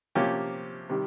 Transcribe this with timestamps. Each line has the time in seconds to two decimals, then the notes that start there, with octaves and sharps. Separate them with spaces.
0.15 C3 F3 A#3 C#4 G4
0.90 C3 D#3 G3